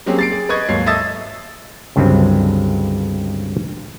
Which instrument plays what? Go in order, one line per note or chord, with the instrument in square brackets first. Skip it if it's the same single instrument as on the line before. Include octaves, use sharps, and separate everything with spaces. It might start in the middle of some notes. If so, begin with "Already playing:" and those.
[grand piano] F#3 A#3 C4 C#4 G4 G#4
A6 C7 D7
G#4
B4 D#5 C#6 G#6
D#2 G#2 F#3 C#5 C7
A4 D#5 E5 D#6 E6 A6
[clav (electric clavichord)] C#2 G2 D3 F#3 G#3 C4